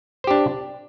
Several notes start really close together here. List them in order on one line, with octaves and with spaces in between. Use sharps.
C5 G4 D4